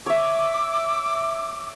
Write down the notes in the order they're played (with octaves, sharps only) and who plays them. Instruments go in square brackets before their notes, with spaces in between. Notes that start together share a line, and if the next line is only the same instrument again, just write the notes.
[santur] C#5 E5 [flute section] D6 E6